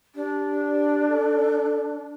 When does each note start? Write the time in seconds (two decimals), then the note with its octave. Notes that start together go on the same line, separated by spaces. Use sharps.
0.15 D4 G4
1.07 A4